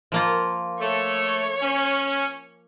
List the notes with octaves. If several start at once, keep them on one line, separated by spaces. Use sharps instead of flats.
F3 A#3 F4
A3 C#5
C#4